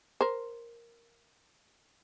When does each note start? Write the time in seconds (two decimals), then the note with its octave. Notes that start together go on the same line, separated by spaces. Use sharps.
0.21 A#4 C5